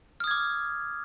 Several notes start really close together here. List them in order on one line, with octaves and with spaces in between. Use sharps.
F6 D#6 G#6 D6